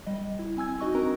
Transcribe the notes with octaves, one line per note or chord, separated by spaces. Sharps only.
G3 D#5
E4
C4 G#5 E6 G#6
D#4 F#4 D#5 C#6
C4 D4 D#4 A#4 A#5